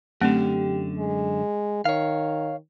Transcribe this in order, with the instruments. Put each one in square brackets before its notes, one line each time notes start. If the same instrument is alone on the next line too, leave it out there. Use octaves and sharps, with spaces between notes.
[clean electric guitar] F#2 D3 [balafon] A3 C4 [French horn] G4
[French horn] G#3
[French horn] D#3 [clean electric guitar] C#5 F5